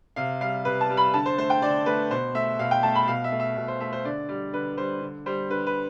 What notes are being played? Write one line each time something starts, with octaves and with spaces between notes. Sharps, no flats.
C3 F5
G3 F5
C3 B4
A5
G3
B5
D3 A5
C5
A3 C5
G5
D3 D5
A3 B4
B2 C5
A3 E5
B2 F5
G5
A3 A5
B5
B2 F5
E5
A3
E5
B2
C5
A3 E5
C5
D3 D5
G3 D5
D3 B4
G3 C5
D3
G3 C5
D3 B4
B4